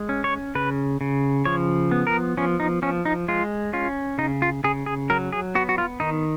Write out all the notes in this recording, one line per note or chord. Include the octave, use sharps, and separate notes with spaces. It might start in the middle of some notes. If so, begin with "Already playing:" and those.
Already playing: G#3
C#4
C#5
C#3 B4
C#3
F3 C#5
B3
A#4
F3 C#4
D#4
F3 C#4
D#4
G#3 F4
C#4 F4
C#3 D#4
F4
C#3 G#4
G#4
F#3 A#4
G#4
B3 F#4
F#4
F4
D#3 D#4